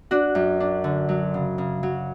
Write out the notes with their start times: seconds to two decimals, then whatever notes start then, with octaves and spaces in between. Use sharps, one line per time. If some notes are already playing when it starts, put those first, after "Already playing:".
0.11 D4 F#4
0.35 F#2
0.60 D4
0.84 D3
1.09 F#3
1.34 C#3
1.58 C#3
1.83 F#3